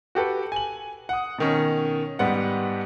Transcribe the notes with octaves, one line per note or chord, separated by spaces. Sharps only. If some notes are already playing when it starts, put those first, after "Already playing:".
F#4 G4 A4 B4
G#5 F#7
F#5 D#6
B2 D#3 C#4
G#2 G3 B3 F#5